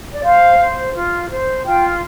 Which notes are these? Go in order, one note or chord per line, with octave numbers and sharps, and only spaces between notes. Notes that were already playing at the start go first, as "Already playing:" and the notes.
D5
C5 F5
C5
F4
C5
F4 G5